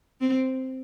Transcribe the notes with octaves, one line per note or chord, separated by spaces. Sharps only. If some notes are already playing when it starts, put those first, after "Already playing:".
C4